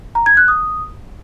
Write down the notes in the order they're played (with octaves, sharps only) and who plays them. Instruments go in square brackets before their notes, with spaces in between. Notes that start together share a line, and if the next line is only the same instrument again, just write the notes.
[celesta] A#5
G#6
F#6
D#6